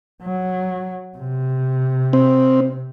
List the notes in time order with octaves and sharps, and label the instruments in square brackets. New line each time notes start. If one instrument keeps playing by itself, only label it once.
[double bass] F#3
C3
[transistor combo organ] C4